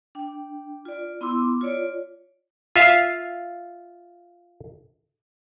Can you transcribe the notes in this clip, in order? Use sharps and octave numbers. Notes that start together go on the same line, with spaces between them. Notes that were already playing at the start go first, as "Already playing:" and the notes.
D4 G5
F4 D5
B3 E4 C6 D6 E6
F4 C#5 D5
F4 E5 F5